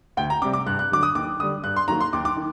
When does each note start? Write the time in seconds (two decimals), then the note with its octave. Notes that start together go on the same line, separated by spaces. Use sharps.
0.17 D2 G5
0.30 A#5
0.42 C3 G3 C4 D6
0.53 D6
0.66 G2 F#6
0.79 F#6
0.91 D3 F#3 D6
1.03 D#6
1.15 D#2 D6
1.39 D3 D#6
1.43 G3
1.63 G2 F#6
1.76 C6
1.88 D#3 F#3 A#3 A#5
2.01 C6
2.13 D#2 D6
2.25 D6
2.36 D#3